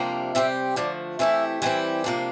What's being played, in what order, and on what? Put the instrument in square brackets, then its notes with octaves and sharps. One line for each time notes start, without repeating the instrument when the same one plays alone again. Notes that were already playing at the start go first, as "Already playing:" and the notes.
Already playing: [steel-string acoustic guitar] F2 C3 G3 A#3 D4
[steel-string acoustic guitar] C3 G3 C4 G4 [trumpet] E5
[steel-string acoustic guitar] D3 F3 A3 [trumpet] D5
[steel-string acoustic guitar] C3 E3 A3 E4 G4 [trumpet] E5
[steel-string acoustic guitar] E3 G3 C4 E4 G4
C3 F3 A#3 D4